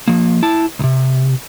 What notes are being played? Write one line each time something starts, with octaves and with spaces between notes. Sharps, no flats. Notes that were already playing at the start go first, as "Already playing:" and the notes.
F3 A#3
E4 A5
C2 C3